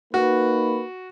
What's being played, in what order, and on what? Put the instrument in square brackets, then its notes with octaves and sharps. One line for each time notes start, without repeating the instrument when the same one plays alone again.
[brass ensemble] A#3 D#4 B4 [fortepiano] F#4